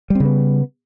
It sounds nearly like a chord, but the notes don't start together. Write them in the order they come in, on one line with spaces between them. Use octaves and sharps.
G3 C4 C#3 B3